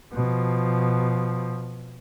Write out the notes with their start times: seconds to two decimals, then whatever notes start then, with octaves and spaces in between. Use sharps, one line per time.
0.13 B2 F3